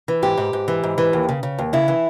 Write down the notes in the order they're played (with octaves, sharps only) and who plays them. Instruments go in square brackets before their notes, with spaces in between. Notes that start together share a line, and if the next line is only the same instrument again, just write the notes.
[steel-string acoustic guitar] E3
G#2 G4
G#2
G#2
E3
G#2
E3
D#2
C#3
C#3
D#2
C#3 E4
E3